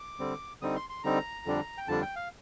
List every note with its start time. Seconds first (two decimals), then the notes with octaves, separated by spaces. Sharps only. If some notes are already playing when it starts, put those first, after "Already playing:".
Already playing: D6
0.19 D3 G3 C4
0.61 D3 G3 C4 D#4 D#6
0.76 C6
0.90 C6
1.04 D3 G3 C4 D#4 A#5
1.46 F2 D3 G3 D4
1.78 G5
1.87 F2 D3 G3 D4 A5
2.02 G5
2.16 F5